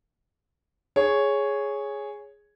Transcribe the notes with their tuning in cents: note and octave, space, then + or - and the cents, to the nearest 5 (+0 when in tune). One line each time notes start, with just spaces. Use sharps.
G#4 +0 C#5 +0